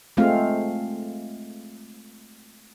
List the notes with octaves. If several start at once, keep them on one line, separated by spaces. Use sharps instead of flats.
G#3 A3 C4 F4 F5